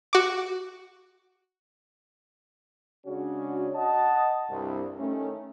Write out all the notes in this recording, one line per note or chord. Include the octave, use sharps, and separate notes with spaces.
F#4 D6
C#3 G#3 C#4 D4 F#4
D#5 F#5 A5
C2 G2
D#3 A3 C#4